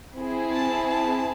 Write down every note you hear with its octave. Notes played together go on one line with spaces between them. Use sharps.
C4 E4 G#4
A5
A5